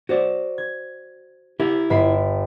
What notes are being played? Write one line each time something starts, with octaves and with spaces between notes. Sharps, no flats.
F#4 C5 D5
G#6
E4 G4 A#4
G1 B5 C7